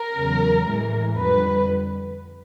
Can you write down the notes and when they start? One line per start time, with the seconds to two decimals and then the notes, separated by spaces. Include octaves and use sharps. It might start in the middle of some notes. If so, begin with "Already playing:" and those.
Already playing: A#4
0.16 E2 C#3 F#3
0.67 A2 E3 G#3
1.18 F2 D3 G3 B4